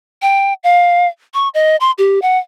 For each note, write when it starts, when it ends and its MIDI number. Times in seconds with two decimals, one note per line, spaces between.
0.22 0.53 79
0.64 1.07 77
1.34 1.49 85
1.54 1.76 75
1.80 1.91 84
1.98 2.19 67
2.22 2.38 78